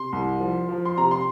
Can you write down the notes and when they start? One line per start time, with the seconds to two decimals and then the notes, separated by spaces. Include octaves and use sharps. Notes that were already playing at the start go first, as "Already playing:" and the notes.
Already playing: C3 C6
0.12 C2
0.41 F3
0.69 F3
0.85 C6
0.97 C3 A#5
1.11 C6